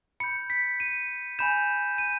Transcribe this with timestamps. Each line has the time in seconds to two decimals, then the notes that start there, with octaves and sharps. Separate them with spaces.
0.20 B5 G6 C#7
0.50 B6
0.80 D#7
1.39 G#5 B5 G6 E7
1.98 D#7